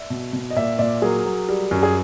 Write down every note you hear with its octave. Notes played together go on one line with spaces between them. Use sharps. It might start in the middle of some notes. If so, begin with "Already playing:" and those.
Already playing: D5 E5
B2
B2
D#5
A#2 D5 E5
A#2 D5 E5
F#3 G#4 A#4
F#3
G3
F#2
G#4